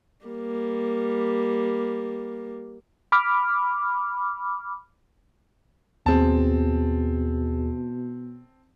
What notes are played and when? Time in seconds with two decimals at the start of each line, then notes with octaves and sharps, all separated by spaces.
0.26 G3 A#3
3.12 B5 D6 F6
6.06 D#2 B2 C4 G#4 A5